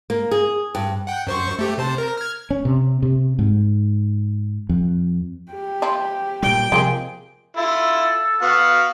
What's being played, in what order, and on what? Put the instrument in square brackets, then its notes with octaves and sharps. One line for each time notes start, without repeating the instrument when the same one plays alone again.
[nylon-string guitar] A#3
G#4
G2
[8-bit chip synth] F#5 G5
F#2 C5 C#6
A3 G4
C3 C5 A5
A#4
F6 G#6
[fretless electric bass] C#4
C3
C3
G#2
F2
[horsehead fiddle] G4
[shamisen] F3 E4 F4
[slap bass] A#2 G3 [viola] G5
[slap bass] C3 F3 [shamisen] G#3 A#3 G#4
[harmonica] E4 F4 [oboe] A4
[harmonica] B3 F#4 [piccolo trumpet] F5